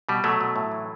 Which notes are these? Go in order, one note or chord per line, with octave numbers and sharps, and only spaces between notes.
B2 G3
B2 F#3 A3
B2
A2
E3